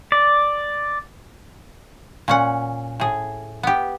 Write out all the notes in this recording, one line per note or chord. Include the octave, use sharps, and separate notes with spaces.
D5
A#2 C#4 F#5
A2 G#4
B3 G4